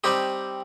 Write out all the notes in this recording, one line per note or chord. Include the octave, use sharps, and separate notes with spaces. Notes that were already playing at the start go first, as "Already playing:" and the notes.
G3 C4 D#4 G4